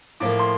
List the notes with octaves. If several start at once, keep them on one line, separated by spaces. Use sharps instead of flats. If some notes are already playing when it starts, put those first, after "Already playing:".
A2 F3 A#3 D6
C6